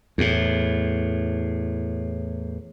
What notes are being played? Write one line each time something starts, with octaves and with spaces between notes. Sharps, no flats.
E2 A2